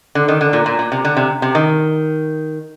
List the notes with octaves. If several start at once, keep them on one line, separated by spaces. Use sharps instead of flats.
D3
D#3
D3
A#2
A#2
A#2
C3
D3
C3
C3
D#3